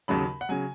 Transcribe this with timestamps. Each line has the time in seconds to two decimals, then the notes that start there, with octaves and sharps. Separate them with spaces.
0.08 D#2 C#3 F#3 B5
0.41 F#5
0.49 C#3 F#3 G#5